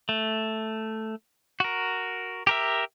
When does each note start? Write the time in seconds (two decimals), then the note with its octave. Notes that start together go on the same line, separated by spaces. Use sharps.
0.09 A3
1.60 F#4 A#4
2.47 G4 A#4 E5